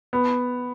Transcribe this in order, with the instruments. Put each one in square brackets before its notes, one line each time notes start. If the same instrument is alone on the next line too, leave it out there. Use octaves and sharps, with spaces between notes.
[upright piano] B3